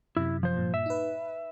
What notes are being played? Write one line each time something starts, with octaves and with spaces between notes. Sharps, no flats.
F#2 C3 E4
F3 C5
G2 A#2
E5
D#4 B4